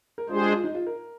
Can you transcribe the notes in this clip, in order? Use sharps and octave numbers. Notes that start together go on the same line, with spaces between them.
A#4
G#3 D4 F4 G#4 C5
G4
F4
F4
D#4
F4
A#4